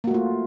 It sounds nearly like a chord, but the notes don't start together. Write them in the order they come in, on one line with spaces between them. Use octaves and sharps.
A#3 F#4 A3 F4